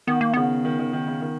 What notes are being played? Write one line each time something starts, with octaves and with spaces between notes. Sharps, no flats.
D#3 B3
A#3
C#3 B3
D#3
D#3
D#3
C#3
D#3